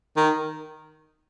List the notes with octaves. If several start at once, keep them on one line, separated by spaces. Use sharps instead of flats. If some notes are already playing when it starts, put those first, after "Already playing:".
D#3